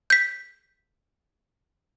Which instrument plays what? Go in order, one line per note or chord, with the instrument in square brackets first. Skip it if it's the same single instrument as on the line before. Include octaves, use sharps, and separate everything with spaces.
[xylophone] G6 B6